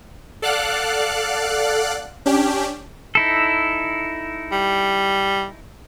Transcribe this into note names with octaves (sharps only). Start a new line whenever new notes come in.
A4 D5 F5 F#5 F#6
C#4 D4 G4
D#4 E4 A4
G3